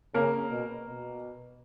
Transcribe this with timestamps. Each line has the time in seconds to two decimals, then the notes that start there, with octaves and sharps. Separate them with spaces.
0.14 C#3 A#3 A#4
0.51 B2
0.87 B2